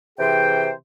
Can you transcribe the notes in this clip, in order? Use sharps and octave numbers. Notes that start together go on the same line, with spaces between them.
C3 E3 G#4 C5 G5